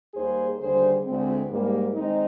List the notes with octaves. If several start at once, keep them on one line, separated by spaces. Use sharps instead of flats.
D#2 D#3 G3 A#3 G#4 C5
D#2 D3 G3 G#4 C5
D2 D3 G#3 C4
G#2 G3 A#3
D#3 G#3 C4 D#4